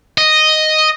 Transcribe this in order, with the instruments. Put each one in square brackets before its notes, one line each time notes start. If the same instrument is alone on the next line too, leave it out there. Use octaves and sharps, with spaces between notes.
[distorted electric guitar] D#5